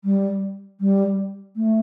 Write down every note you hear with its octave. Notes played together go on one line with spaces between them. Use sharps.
G3
G3
A3